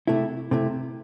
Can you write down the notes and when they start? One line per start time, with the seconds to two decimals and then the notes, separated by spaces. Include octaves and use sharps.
0.07 C3 A3 E4
0.51 C3 A3 E4